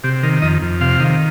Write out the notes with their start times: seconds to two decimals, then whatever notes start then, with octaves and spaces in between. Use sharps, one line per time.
0.04 C3 G4
0.23 D#3 A#4
0.42 F2 D#5
0.62 F2
0.81 C3 F5
1.00 D#3